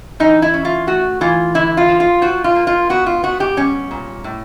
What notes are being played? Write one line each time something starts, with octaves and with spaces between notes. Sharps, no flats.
E3 D#4
E4
C#4
F4
A3 F#4
E3 F4
D3 E4
F4
F3
F4
F3 F#4
F4
A#3
F4
B3 F#4
F4
B3 F#4
G4
G3 C#4
A#2
A2